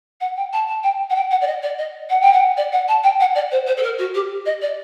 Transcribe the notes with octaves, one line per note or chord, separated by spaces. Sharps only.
F#5
G5
A5
A5
G5
F#5
G5
F#5
D5
D#5
D5
D#5
F#5
G5
F#5
D5
F#5
A5
G5
F#5
D5
C5
C5
A4
A#4
F#4
G4
D#5
D5